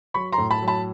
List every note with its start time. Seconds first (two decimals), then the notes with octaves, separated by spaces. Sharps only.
0.14 F#3 B5 C#6
0.32 A#5 C6
0.38 A2
0.51 A5 B5
0.62 F#3
0.68 A5 B5